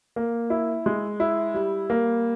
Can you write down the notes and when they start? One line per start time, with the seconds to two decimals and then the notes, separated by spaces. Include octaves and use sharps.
0.16 A#3
0.50 E4
0.86 G#3
1.20 E4
1.54 G3
1.90 A#3